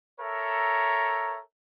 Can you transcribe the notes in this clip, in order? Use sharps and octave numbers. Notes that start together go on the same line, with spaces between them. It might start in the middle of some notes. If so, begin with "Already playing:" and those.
A4 A#4 C#5 E5 A#5